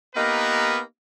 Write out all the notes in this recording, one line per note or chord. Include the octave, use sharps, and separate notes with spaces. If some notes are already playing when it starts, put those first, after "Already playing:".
A#3 B3 D#4 G4 A#4 B4